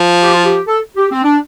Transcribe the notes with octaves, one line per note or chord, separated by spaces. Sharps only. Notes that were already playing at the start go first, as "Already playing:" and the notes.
Already playing: F3
G4
F4
G4
A4
G4
C4
D4